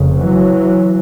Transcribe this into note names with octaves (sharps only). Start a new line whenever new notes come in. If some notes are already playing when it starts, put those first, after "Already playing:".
Already playing: F1 F2 C#3
E3 F#3